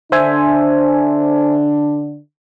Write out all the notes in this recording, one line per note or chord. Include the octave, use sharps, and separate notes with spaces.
D3 D4 C5 E5 G#5